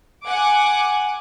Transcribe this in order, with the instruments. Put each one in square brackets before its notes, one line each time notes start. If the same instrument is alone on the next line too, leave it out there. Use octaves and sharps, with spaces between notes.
[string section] F#5 G#5 D6